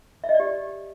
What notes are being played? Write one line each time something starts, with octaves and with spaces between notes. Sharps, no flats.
E5
D#5
D5
G4